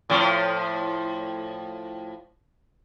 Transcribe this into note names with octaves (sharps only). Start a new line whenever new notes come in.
A2 F3